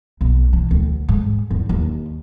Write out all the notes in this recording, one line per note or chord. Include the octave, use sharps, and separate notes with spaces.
B1
E3
D2
G#2
E2
D#2